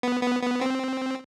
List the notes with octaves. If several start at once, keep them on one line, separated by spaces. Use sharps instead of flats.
B3
B3
B3
C4